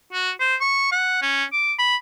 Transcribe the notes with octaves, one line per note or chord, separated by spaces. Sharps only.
F#4
C5
C#6
F#5
C#4
D6
B5